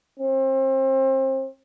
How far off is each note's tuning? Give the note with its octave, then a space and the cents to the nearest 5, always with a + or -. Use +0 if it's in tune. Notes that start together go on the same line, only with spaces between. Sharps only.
C4 +30